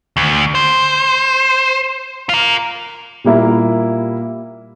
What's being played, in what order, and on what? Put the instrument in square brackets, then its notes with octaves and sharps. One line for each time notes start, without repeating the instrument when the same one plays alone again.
[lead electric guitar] D2
C5
F4 A#4
[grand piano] A#2 G3 A#3 E4